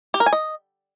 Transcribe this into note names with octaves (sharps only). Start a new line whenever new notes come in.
G4
A#4
G#5
D#5